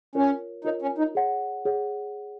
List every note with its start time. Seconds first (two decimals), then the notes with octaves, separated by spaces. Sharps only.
0.15 C#4 F4 A#4 C#5
0.64 D#4 F4 A#4 C#5
0.82 C#4
0.98 D#4
1.15 G#4 C#5 F#5
1.65 G#4 C#5 F#5